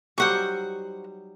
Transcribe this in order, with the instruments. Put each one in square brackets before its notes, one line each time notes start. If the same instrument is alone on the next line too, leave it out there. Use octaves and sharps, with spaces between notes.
[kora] F#3 G3 D#4 [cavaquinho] C5 F#5 C#6